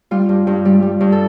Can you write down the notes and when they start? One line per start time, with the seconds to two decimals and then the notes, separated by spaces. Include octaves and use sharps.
0.11 G3 F4
0.29 G2
0.47 G2
0.65 G3
0.82 G3
1.01 G2
1.12 A4